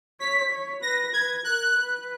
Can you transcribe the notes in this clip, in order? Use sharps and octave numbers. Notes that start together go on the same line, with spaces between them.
C#5 B6
C#5
B4 A#6
B4 G#6
A#4 F#6
B4